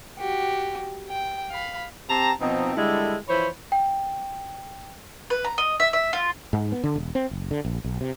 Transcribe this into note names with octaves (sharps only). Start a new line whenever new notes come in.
F#4 G4
G5
F5 B5
C4 G4 A5 A#5
B2 F3 C4 D#4
D3 G3 G#3 E4 A4
E3 F3 C5 C#5 B5
G5
B4
A#5
D#5
E5
E5
F4
G#2
B3
D3
E1
C4
F#1
D3
A#1
B1
C3